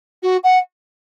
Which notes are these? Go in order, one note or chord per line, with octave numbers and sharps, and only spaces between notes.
F#4
F#5